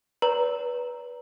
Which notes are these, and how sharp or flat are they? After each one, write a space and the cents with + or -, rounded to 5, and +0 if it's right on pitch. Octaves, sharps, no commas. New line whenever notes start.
B4 -15 D5 -45 A#5 +0